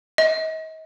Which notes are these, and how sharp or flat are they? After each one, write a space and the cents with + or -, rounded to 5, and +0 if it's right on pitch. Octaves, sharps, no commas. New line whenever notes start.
D#5 +40